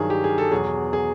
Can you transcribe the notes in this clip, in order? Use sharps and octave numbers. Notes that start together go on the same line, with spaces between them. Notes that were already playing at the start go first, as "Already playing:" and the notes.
Already playing: G2 D#3 F#3 G#4
G4
G#4
A4
E2 B2 F#3 G#4
G#4